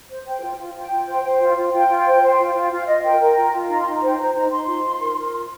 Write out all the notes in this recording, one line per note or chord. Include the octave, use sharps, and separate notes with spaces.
C5
C5 G5
F4
F4
F4 G5
F4
C5
C5
F4
F4
F4 G5
F4
C5
C5
F4
F4
F4 F5
F4 D#5
A#4 G5
A#4
F4
F4
D#4 A#5
C6
D#4
A#5
C5 G5
C5 A#5
D#4 A#5
D#4 C6
F4
F4
A#4
A#4
F4